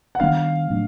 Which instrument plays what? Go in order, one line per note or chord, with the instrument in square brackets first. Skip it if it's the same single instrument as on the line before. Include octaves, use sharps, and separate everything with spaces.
[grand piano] F#5
[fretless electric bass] D#3 G3 B3 D4 [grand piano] F5
[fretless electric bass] A2 F#3 A3 D4